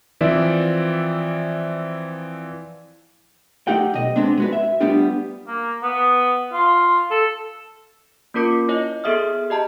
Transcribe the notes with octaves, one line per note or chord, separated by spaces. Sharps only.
E3 F3 C4 D5 E5
A3 D#4 G4 F#5 G5
B1 D#5
G#3 B3 C4 D4
G#3 F#4 B4
E5
G3 A3 B3 D4 F4 G4
A#3
B3
F4
A4
A#3 C#4 F4 A#4 D6 C#7
E4 C#5 D#5
B3 G#4 A4 E5 D#6 F6
G4 D#5 A5 A#5